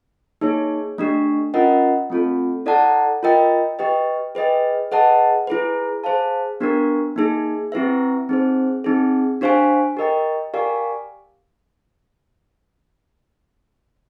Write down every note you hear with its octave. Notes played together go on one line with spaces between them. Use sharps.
A#3 D#4 G#4 C#5
A3 D4 G4
C#4 F4 A#4 D#5 F#5
A3 C4 F4 A4
E4 A4 D5 F#5 A5
F4 A#4 D#5 G5
G4 B4 D#5 G5
G#4 B4 D#5 G5
G#4 B4 D#5 F#5 A5
E4 G#4 B4
G#4 C5 F5 A5
B3 D4 G4 A#4
A#3 D#4 G#4
C4 E4 G4 B4 E5
C4 D#4 G#4 C5
C4 D#4 G#4
D4 G4 C5 F5 G#5
G4 A#4 D#5 G5
G4 A#4 D5 F5 G#5